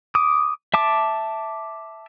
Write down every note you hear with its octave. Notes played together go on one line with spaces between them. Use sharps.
D6 D#6
E5 A5 D6